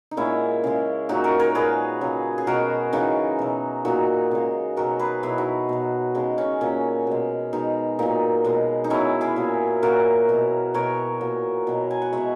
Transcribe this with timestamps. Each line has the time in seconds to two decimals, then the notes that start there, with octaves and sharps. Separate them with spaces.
0.11 D#4
0.17 A#2 G#3 C#4 E4
0.64 C#3 G#3
1.09 A#2 F#3 D#4 F#4
1.24 F#4 A#4
1.40 A#4 C#5
1.55 A#2 G#3 G#4 B4
2.01 C#3 F#3
2.38 G#4
2.47 B2 G#3 F#4 A#4
2.93 C#3 E3 G#3 D#4 F#4
3.39 B2 F#3
3.85 A#2 F#3 D#4 F#4
4.31 C#3 G#3
4.77 B2 F#3 F#4 A#4
4.99 G#4 B4
5.23 B2 F#3 E4 G#4
5.38 D#4 F#4
5.69 B2 F#3
6.15 C#3 G#3 D#4
6.38 C#4
6.61 A#2 F#3 C#4
7.07 B2 G#3
7.53 B2 G#3 D#4
7.99 A#2 F#3 D#4
8.45 B2 G#3
8.84 D#4
8.90 B2 F#3 C#4 E4
9.21 E4 G#4
9.36 A#2 F#3
9.83 A#2 F#3 F#4 A#4
10.29 B2 F#3
10.74 B2 F#3 A#4 C#5
11.21 A#2 F#3
11.67 B2 F#3
11.91 G#5
12.02 F#5
12.13 B2 G#3 C#5 E5